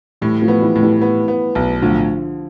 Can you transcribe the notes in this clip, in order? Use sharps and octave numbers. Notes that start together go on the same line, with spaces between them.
A2 E3 G3
F3 A3
B3
E3 G3
A2
E3 G3
B3
B3
B1
A2 D3 F3